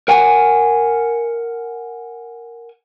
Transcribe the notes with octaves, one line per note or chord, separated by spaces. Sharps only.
A#4 F#5 G#5